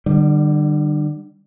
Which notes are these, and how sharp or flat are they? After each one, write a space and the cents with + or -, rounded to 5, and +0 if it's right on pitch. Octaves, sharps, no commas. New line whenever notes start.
D3 +40 G3 +0